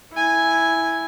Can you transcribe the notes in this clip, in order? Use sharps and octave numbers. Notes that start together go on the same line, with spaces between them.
E4 G#5